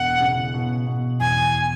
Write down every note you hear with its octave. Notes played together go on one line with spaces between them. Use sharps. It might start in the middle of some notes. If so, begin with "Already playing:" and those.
Already playing: E1 E2 F#5
C#3
B2
B2
E2 G#5